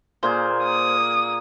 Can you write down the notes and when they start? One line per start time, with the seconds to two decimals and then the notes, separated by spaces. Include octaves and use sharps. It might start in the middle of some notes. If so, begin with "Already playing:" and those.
0.23 A#2 A#3 G#4 C5
0.63 D#6